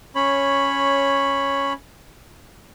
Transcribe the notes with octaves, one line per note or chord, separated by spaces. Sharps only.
C#4 C#5 B5